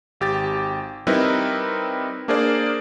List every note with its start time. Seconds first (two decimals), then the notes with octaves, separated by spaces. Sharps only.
0.20 G#1 G4 A6
1.07 G3 C4 D#4 E4 A#4 B4
2.28 A#3 D4 G#4 A#4 C5 D5